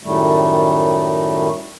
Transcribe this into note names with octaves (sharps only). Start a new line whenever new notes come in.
F#2 A2 D#3 G3 A3